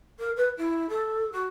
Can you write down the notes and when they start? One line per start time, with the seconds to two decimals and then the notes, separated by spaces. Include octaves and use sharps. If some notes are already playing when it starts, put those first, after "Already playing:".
0.19 A#4
0.36 B4
0.57 E4
0.89 A4
1.32 F#4